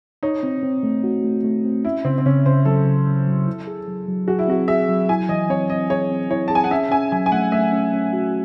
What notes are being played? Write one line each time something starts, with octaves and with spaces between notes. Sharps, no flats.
D#4 C#5
C4
C4
A3
F#4
A3
A3
C4
C#4 E4
C#3 C4
C4
C#3 C#4
C#3 C5
F#3 A4
C#3
C#3
F#3
E4
G#4
F#3
F#3
F#4 G#4
E4
C4 F#4
G#4 E5
F#3
E4 G#5
E3 D#5
C4 C#5
C4 D#5
G#4 C#5
C4
E4 C#5
A5
G#4 G#5
F#5
C#4 E5
C#4 G#5
F#3 G#5
G#5
A3 F#5
A3 E5
C#4
C#4
F#4